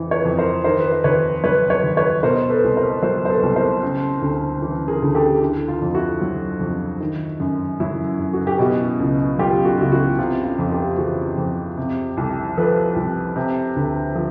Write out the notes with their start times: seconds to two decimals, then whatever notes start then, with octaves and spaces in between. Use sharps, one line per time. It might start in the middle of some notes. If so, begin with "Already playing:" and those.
Already playing: F2 E3
0.11 B4 C#5
0.25 F2
0.37 A#4 C5
0.64 D#3 A#4 C5
0.80 B4
0.92 C5
1.04 D#2 B4 C#5
1.44 F#3 B4 C#5
1.70 B4 C#5
1.83 D#2
1.97 B4 C#5
2.23 B2 A#4 C5
2.50 A4 B4
2.64 C2
2.77 A#4 C5
3.02 F#3 A#4 C5
3.25 C5
3.29 A4 B4
3.43 C2
3.55 A#4 C5
3.83 C#3
4.22 D2
4.62 E3
4.88 G#4 A#4
5.02 D2
5.15 G4 A4
5.41 D3 E4
5.68 F4
5.82 F2
5.95 E4 F#4
6.21 F#3
6.60 F2
7.00 D#3
7.40 F#2
7.80 F#3 E4
8.19 F#2
8.33 F#4
8.47 G4
8.59 B2 E4 F#4
9.00 C#2
9.39 F#3 F4 G4
9.65 F#4
9.72 F4
9.78 C#2 E4 F#4
9.92 E4 F#4
10.19 C3 F4
10.44 F4
10.58 F2
10.71 F4 G4
10.98 E3 F#4 G#4
11.37 F2
11.77 C3
12.17 C2
12.57 F3 A4 B4
12.96 C2
13.36 C3
13.76 D2
14.16 F3